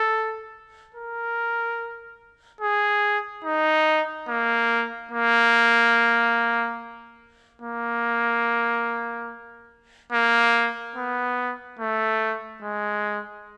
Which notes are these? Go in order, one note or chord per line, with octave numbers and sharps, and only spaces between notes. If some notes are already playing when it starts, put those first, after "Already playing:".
Already playing: A4
A#4
G#4
D#4
A#3
A#3
A#3
A#3
B3
A3
G#3